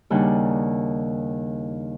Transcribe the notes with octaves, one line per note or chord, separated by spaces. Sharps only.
D#2 C#3 G3 D4 F#5